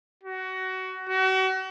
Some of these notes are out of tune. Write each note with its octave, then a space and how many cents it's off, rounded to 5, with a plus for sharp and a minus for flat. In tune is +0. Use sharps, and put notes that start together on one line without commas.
F#4 +20
F#4 +35